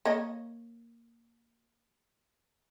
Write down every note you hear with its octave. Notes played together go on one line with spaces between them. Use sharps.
A#3 C#5 D#5